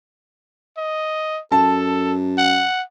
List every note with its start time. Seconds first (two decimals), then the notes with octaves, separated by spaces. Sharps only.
0.77 D#5
1.52 F#2 A4 A5
2.38 F#5